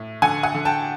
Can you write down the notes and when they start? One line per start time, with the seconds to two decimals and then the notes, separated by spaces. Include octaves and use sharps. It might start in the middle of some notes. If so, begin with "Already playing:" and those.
Already playing: A2
0.22 D3 F#5 G#5
0.43 F#5 G#5
0.54 D3
0.65 G5 A5